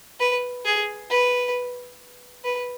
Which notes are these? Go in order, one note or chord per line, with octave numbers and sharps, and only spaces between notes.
B4
G#4
B4
B4